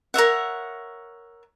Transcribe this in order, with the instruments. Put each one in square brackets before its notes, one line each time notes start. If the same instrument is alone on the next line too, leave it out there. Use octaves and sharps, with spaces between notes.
[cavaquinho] A#4 C#5 E5 F#5